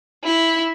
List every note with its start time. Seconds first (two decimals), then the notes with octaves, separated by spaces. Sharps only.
0.24 E4